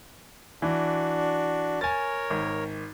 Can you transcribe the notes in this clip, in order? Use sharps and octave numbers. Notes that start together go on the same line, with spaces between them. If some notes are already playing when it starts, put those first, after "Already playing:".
E3 D4 F#4
A#4 C#5 G#5 A6
G#1